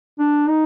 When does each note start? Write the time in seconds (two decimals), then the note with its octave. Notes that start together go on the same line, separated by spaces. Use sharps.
0.19 D4
0.49 D#4